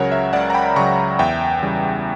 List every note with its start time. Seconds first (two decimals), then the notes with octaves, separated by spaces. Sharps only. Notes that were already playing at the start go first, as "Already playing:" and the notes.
Already playing: C#2 C#3 F#3 A#4 C#5 F#5 A#5
0.11 C#5 E5
0.33 C#2 D5 F#5
0.50 A#5
0.54 G5 B5
0.76 C#3 A#5 C#6
0.79 F#3
1.19 E2 E5 G5
1.63 C#3 E3 G3